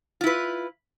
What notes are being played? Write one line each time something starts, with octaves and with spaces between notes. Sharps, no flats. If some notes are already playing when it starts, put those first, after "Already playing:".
E4 F4 B4